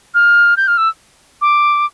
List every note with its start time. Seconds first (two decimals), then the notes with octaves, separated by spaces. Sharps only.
0.14 F6
0.57 G6
0.68 F6
0.78 E6
1.41 D6